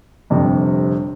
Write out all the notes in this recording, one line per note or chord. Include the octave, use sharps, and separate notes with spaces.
G1 F2 C3 G3